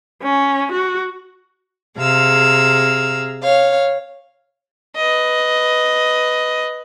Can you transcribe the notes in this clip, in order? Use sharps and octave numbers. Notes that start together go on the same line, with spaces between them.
C#4
F#4
C3 G#4 F5 A#5 E6
C#5 F5
B4 D#5